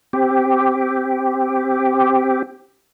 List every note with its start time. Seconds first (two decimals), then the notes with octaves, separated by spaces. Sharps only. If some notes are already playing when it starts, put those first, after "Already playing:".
0.13 C4 G4